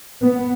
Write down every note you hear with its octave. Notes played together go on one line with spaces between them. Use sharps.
B3